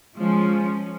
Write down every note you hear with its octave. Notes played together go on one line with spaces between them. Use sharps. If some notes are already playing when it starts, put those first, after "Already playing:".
F3 G#3 C#4